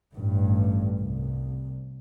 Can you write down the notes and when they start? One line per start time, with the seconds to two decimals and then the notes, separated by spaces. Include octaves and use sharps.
0.15 A1 G2
1.01 C2